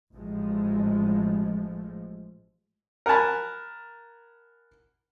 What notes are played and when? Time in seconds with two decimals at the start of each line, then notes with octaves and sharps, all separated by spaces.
0.14 A1 F3 G#3 A3
3.06 A#4 F#5 G#5 A5 B5